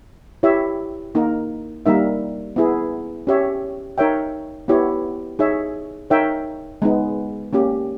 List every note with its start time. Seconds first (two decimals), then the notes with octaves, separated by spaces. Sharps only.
0.43 E4 G4 C#5 E5
1.15 A#3 D#4 A#4
1.86 G3 A#3 D#4 A#4 E5
2.56 B3 E4 G#4
3.27 C#4 G4 C#5 E5
3.98 D#4 A#4 C#5 E5 G5
4.68 B3 E4 G4 C#5
5.39 D#4 G#4 C#5 E5
6.10 D#4 A#4 C#5 E5 G5
6.82 G#3 B3 D#4
7.53 A#3 C#4 G4